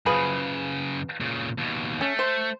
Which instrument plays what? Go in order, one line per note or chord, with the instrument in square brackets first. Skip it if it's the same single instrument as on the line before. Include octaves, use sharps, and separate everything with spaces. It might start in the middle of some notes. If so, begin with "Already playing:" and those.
[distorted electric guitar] F#2 C#3 [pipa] F3 G#4 B4
[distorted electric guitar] A#2 C#3
D#2 B2
[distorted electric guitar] A3 [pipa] C#4
[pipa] C5